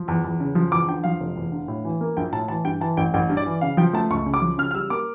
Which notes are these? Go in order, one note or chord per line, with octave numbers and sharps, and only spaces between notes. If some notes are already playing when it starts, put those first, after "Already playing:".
Already playing: F3
E2
E2
C#3
F3
E2 D6
D3 G5
F3 F5
F1
E2
D3
A2
E3
A#3
A#1 G5
A2 A5
E3 A5
G2 G5
E3 A5
A1 G5
A1 G5
G2
D5
E3
C#3 F5
F3 G5
A3 A5
C#2 C#6
C#3
D6
F3
C#3 F6
F6
G3 E6
A#3 D6